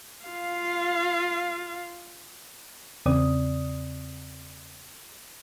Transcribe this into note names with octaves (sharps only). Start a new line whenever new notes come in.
F4 F5
E2 C#3 C4 D5 D#6